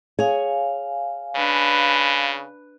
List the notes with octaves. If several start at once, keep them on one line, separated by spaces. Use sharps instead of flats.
G#4 C#5 F5 G#5
C#3 D4 B4